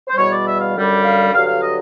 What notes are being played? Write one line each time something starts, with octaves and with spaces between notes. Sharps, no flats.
C5
E2 B2 G3 C#5
D5
E5
F5
F#2 D3 G3
F5
G2 D3 F#3 F5
F5
D#5